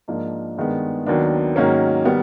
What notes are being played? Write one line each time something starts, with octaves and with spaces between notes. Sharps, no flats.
G#2 F3 A#3 D4
G2 D#3 G#3 B3
D#2 D#3 F#3 B3 D4
G#2 D#3 F#3 A#3 C#4
D#3 G3 B3